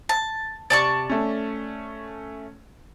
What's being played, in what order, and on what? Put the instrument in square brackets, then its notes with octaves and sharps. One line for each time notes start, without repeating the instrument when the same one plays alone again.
[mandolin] A5
[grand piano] C3 [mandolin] D5 A5 C#6
[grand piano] A3 C#4